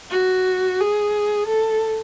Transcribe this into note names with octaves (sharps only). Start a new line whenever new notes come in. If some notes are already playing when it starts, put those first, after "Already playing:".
F#4
G#4
A4